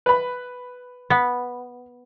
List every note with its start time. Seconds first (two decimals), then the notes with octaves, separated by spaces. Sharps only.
0.06 B4 B5
1.10 B3